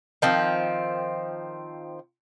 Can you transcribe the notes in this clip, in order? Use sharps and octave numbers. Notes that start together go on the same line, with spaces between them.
D#3 F3 C4